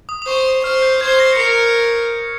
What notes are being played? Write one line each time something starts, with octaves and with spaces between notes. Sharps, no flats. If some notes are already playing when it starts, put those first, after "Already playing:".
D#6
D#6
C5 C#6
D#6
C5 F6
G6
C5 G#6
A#6
C#7
A#4 C7